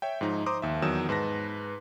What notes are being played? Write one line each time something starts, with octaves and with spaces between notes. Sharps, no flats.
C#5 E5 G5
G#2 F3 D#4
C5 A#5 C6 D6 D#6
D#2 E5
E2 D#3 F#3 D#6 E6 E7
G#2 B4 A5 A#6